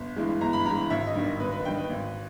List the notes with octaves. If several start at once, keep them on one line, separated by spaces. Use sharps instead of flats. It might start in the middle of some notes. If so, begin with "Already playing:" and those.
Already playing: G1
G2 E3 G#3
G1 A#5
B5
G2 E3 G#3 A#5
G#1 E5
D#5
G2 D#3 G3
G#1 B4
B4
G2 D#3 G3 G5
B4
G#1